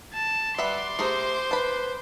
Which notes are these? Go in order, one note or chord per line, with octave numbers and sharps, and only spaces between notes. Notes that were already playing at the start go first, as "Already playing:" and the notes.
A5
G3 B4 E5 F#5 C6 D6
A3 G4 G#4 A#4 C5
B4 A5 B5